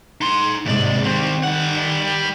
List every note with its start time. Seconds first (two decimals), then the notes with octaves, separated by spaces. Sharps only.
0.21 D#4 C6
0.65 D#2 G#2 C3 G#3 D5
1.04 D#3 G3 C4
1.43 G3 F#5